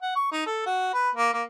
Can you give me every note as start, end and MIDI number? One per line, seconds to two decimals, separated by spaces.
0.02 0.13 78
0.16 0.27 85
0.32 0.43 63
0.46 0.62 69
0.66 0.93 66
0.93 1.10 71
1.16 1.32 58
1.34 1.43 58